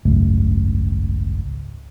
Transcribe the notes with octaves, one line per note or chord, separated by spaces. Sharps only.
G#1 C#2 F#2 A3